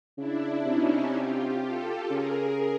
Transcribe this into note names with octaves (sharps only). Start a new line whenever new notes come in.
C#3 D4 E4
C3 C#4 D#4
B2
C3
F4 G4
G4 A4
C#3 G#4 A#4